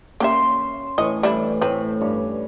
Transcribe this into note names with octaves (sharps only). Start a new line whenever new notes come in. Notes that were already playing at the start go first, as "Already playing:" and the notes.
A#3 C#4 G4 E5 C6
A2 E3 D#5 C#6
G3 D4 E4
A2 C4 B4
G2 C#5